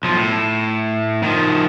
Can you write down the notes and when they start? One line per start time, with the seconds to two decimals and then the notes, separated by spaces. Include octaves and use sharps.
0.03 B1 F3
0.16 A2
1.23 D#3 F3